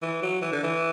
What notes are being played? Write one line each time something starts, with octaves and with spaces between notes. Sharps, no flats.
E3
F#3
E3
D3
E3